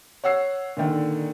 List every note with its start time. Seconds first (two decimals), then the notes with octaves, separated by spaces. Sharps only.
0.24 C#5 F#5 E6 C7
0.77 A#2 D3 D#3